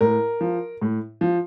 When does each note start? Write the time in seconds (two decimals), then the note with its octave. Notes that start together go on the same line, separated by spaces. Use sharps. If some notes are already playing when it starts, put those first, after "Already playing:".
0.01 A2 A#4
0.41 F3
0.82 A2
1.21 F3